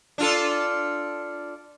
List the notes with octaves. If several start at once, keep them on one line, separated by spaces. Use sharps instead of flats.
D4 F4 A4